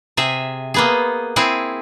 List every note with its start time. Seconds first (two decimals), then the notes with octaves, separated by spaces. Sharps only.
0.17 C3 G#4 E5
0.74 A#3 B3 G#4
1.36 C4 E4 G#4